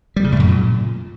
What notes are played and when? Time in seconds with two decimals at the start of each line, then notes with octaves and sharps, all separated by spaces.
0.16 G3
0.24 C#3
0.32 A2
0.40 F#2
0.48 A#2